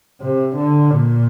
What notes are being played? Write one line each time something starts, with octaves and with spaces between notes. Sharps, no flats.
C3
D3
A#2